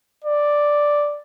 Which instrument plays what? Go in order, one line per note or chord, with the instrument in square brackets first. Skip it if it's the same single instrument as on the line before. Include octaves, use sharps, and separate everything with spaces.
[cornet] D5